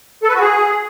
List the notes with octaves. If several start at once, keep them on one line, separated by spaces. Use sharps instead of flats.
A4
B4
F#4
G#4